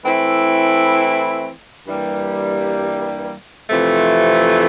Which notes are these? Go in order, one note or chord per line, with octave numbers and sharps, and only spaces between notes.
E3 A3 C4 E4
G2 E3 G3 A#3
F2 C3 E3 A3